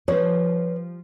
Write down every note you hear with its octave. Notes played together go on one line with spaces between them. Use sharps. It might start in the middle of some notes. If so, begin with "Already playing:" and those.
F3 G3 B4 C#5